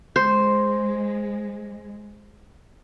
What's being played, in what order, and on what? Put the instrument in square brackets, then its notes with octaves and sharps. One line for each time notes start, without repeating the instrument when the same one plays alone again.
[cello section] G#3 [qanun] C5